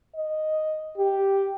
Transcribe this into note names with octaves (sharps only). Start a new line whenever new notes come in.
D#5
G4